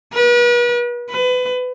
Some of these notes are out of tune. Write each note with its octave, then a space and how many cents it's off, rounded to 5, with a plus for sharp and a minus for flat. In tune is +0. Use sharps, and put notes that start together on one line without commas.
B4 -40
B4 +25